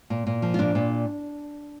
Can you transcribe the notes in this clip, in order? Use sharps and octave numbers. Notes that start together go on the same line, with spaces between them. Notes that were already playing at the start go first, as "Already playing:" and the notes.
A#2
A#2
F3
F4
A#2 D4
A#2